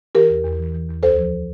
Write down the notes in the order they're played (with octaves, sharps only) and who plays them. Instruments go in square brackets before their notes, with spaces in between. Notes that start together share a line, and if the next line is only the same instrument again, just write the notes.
[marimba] E3 G4 A#4
E2
E2
E3
E3
E2
D2 A4 C5
F3